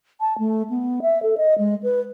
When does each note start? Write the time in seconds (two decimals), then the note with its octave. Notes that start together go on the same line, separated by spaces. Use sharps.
0.20 A5
0.39 A3
0.70 B3
1.02 E5
1.23 A4
1.37 D#5
1.58 G#3
1.83 B4